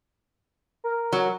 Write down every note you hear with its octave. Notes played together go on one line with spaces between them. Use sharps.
A#4
F#3